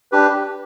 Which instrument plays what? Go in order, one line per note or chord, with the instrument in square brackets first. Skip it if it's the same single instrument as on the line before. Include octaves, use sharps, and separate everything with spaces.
[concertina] D4 G4 B4